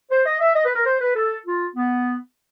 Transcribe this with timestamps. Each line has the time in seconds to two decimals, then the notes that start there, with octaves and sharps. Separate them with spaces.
0.10 C5
0.25 D#5
0.40 E5
0.56 D#5
0.65 B4
0.76 A#4
0.86 C5
1.01 B4
1.16 A4
1.46 F4
1.76 B3